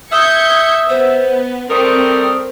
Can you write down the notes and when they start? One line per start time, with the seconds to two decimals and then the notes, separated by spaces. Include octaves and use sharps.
0.12 E5 D#6 G6 G#6 C#7
0.89 B3 C5
1.70 G3 A3 C4 A#4 D#6